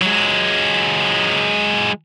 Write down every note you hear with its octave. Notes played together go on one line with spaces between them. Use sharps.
F#3 G#3